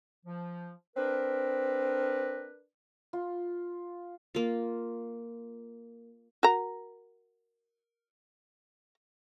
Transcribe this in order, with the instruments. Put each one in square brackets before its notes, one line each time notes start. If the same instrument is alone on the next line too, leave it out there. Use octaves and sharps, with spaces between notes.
[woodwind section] F3
[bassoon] C4 [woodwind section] D4 A#4 B4
[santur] F4
[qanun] A#3 F4
[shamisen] F#4 A#4 A#5